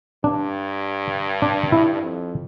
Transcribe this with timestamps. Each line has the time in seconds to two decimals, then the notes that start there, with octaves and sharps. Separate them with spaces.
0.24 G2 D4
1.42 D4
1.72 E4
2.02 F2